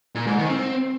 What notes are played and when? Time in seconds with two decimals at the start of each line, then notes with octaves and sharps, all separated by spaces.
0.15 A#2
0.27 G#2
0.38 D#3
0.50 C4